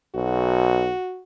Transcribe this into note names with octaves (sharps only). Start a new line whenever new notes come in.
B1 F#4